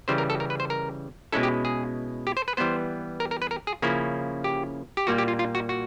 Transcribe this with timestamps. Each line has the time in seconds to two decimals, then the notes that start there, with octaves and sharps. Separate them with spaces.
0.08 C#3 E3 G3 C5
0.18 A#4
0.30 A4
0.40 A#4
0.50 B4
0.60 C5
0.70 A#4
1.32 B2 G#3 C#4 E4 A4
1.43 G4
1.65 G#4
2.27 G4
2.37 C5
2.48 B4
2.57 E3 G3 B3 C5
3.20 A#4
3.31 A#4
3.42 B4
3.51 A#4
3.67 G#4
3.82 C#3 F3 A#3 C#4 E4
4.44 G4
4.97 G4
5.07 A#2 G3 A#3 F#4
5.18 G4
5.28 F4
5.39 F4
5.55 F#4
5.69 F#4